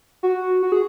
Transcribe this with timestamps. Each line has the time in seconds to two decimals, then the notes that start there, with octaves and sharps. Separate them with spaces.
0.23 F#4
0.62 F#4
0.72 G#4